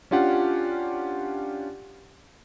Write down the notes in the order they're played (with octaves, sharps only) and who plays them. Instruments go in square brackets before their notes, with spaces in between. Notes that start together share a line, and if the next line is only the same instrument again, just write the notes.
[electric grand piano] C#4 D4 F4 G4 F#5